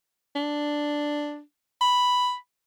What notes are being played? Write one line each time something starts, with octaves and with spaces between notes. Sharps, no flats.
D4
B5